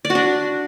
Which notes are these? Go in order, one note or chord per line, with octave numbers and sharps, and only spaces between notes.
D5
F#4
D4